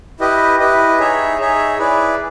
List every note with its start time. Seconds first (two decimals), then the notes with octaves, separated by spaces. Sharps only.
0.20 E4 G4 B4 D#5
0.59 E4 G4 B4 D#5
0.99 D#4 G#4 C#5 E5
1.39 D#4 G#4 C#5 E5
1.78 E4 G#4 B4 D5